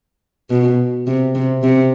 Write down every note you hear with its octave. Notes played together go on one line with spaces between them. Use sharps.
B2
C3
C3
C3